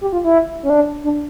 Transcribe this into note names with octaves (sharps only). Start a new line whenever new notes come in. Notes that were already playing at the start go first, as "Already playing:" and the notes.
G4
F4
E4
C#4
D4
D4